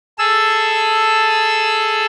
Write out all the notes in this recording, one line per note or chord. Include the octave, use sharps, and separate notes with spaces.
G#4 A4 E6